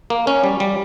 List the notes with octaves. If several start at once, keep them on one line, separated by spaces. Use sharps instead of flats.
A#3
C#4
G3
G3